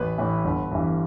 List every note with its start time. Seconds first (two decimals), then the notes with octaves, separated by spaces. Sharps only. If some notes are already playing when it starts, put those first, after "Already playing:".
Already playing: A1 B4
0.18 A2 E3
0.44 G1
0.72 G2 E3